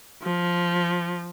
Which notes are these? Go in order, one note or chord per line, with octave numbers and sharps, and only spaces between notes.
F3